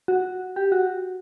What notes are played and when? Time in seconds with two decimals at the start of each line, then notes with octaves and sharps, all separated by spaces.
0.08 F#4
0.56 G4
0.72 F#4